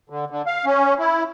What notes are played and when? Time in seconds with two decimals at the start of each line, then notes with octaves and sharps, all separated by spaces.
0.10 D3
0.30 D3
0.46 F5
0.65 C#4
0.99 E4